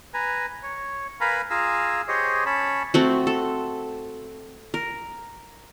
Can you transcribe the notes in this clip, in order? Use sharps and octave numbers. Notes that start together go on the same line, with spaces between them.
B4 G#5 A#5
C#5
A#4 B4 F5 G#5 A#5 B5
F4 G#4 F5 G#5 A#5 E6
G4 G#4 C5 C#5 D#5
C#4 C#5 A5 B5
A3 C4 F#4
A4
A#4